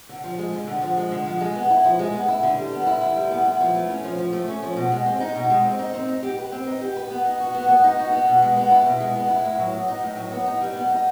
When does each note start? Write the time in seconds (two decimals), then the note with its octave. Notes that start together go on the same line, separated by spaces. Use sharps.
0.09 D3
0.24 F3
0.38 G#3
0.53 D3
0.67 D3
0.82 F3
0.97 G#3
1.12 D3
1.26 F3
1.41 G#3
1.55 B3
1.70 E4
1.84 F3
1.99 G#3
2.13 B3
2.28 E4
2.43 D3
2.58 G3
2.72 B3
2.87 E4
3.02 D3
3.16 G3
3.31 B3
3.45 E4
3.60 F3
3.75 A3
3.89 C#4
4.04 F3
4.19 F3
4.33 A3
4.48 C#4
4.63 F3
4.77 B2
4.92 G#3
5.06 C4
5.20 D#4
5.35 B2
5.50 G#3
5.64 C4
5.79 D#4
5.94 C4
6.08 D#4
6.23 G4
6.38 B4
6.52 C4
6.67 D#4
6.81 G4
6.96 B4
7.10 B3
7.25 D#4
7.40 F#4
7.55 B3
7.69 B3
7.84 D#4
7.98 F#4
8.13 B3
8.28 B2
8.42 G#3
8.56 B3
8.71 E4
8.86 B2
9.01 G#3
9.15 B3
9.30 E4
9.45 A2
9.59 F#3
9.73 B3
9.88 D#4
10.03 A2
10.17 F#3
10.32 B3
10.46 D#4
10.61 G3
10.76 B3
10.91 D#4